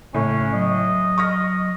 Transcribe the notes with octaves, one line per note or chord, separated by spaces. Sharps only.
A2 C#3 C#4
F#3 D#5
C#6 F6 A#6